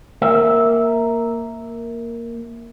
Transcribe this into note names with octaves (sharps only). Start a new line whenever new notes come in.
A#3 A#4 E5